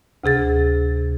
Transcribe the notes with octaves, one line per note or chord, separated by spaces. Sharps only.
D2 C3 G#4 A6